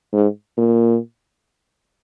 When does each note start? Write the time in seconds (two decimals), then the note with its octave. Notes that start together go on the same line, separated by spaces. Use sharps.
0.13 G#2
0.58 A#2